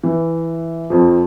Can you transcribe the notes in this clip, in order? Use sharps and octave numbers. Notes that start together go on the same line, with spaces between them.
E3
F2 F3